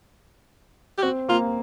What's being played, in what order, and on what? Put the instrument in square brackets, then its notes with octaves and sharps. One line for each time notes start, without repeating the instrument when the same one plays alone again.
[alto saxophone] G4
[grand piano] C4 [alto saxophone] F#4
[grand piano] A#3 [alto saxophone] F4